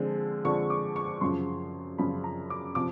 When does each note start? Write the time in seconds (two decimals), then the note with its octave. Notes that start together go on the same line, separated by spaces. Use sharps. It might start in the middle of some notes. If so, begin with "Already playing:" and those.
Already playing: D3 F3 G#3 C4
0.44 D3 F3 G#3 C4 C#6
0.70 D6
0.96 C#6
1.21 F#2 C#3 F3 C6
1.98 F#2 C#3 F3 B5
2.24 A#5
2.50 D6
2.75 C3 F3 D6